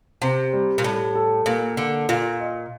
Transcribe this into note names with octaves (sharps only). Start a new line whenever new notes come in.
C3 C4
G3
A#2
A2 G3
A4
A#2 A#3
D3 A4
A#2 F4
D#5